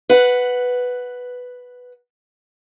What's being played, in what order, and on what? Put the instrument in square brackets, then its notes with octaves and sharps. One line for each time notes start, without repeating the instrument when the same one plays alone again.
[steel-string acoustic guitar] B4 F#5